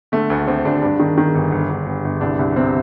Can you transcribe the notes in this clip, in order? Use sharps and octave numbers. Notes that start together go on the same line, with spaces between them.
D3 A3
D2
D2 C4
D2 D4
G2 D4
D#3
D#3
G1
G1
G1
G1
G1
C2 D4
C2
C3 C4